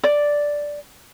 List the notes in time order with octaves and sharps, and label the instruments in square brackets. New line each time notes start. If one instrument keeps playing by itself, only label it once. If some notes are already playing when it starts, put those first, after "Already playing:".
[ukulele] D5